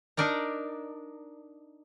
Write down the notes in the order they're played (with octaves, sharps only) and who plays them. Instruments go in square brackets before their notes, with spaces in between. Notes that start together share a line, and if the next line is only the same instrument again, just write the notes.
[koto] D4 D#4 A#4 D5 A#5